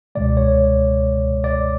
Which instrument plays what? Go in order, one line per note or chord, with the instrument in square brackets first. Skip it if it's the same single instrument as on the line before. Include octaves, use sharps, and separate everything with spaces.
[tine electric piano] C#2 B2 G#3 D5
C#5
D5